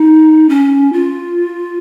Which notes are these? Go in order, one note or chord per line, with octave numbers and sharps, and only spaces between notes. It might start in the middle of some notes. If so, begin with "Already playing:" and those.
Already playing: D#4
C#4
F4